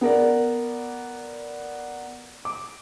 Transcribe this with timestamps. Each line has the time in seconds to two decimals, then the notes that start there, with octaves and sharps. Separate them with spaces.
0.01 B3 A#4 D5
2.45 D6